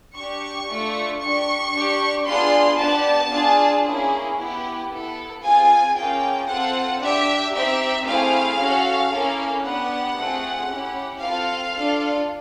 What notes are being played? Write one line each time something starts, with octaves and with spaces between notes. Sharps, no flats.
D4 G4 C#6
A3 D4 F4
D4 G4 C#6
D4 G4
B3 D4 F4 G#4 C6
B3 D4 G4 A5
D4 F4 G#4
A#3 C#4 E4 G#4
B3 E4 G4
B3 E4 A4
C4 F4 G#4 G#5
A#3 C#4 F4 G#4 G5
C4 F4 A4 F#5
D4 G4 E5
C4 D#4 G4 E5
A3 C4 E4 G#4 F5
C#4 F#4 A4
A#3 C#4 E4 A4
B3 D4 G4 F#5
A3 C4 F4 G#4
C#4 E4 G4
C4 F4 A4 F5
D4 F4 A4